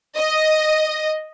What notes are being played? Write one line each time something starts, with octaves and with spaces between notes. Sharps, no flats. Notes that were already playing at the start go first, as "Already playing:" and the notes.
D#5